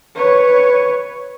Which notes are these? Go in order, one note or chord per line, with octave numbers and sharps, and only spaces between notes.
B4 C#5